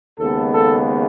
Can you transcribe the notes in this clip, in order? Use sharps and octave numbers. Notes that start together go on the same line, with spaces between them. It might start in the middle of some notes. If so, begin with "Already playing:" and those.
D#2 C#3 G#3 B3 A4
A4